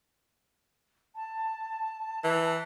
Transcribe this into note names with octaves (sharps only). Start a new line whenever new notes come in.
A5
E3